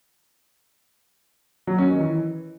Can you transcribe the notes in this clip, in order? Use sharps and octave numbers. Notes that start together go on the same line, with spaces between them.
F#3
C#4
D#3
E3